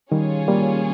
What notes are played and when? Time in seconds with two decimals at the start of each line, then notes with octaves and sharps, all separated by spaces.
0.11 D#3 G3 C#4 F4 G#4 C#5
0.48 G3 A#3